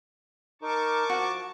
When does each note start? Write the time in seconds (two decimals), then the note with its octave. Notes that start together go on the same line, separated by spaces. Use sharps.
0.62 D#4 A#4 A5 C#6 D6
1.10 F3 F#4